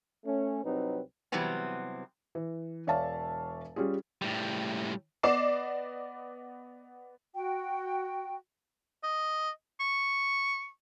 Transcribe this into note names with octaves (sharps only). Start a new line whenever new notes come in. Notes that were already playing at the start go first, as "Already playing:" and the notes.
A3 C#4
C2 F#3 C4 D#4 B4
C3 E3 F#3 G3 B3 C4
E3
E1 C#5 D5 E5 F5 A5
G3 C#4 F4 G#4
A2 G3
B3 D5 D#5 D6 C7 E7
F#4 G5
D#5
C#6